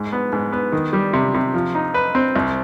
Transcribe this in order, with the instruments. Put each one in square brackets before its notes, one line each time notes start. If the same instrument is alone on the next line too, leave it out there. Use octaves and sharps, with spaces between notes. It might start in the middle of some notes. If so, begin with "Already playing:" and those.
Already playing: [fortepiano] G#2
B3
G#2
B3
D#3
G3
C3
C3
F3
D#4
B4
C4
C2